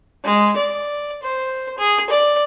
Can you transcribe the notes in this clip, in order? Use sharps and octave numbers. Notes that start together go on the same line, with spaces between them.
G#3
D5
C5
G#4
D5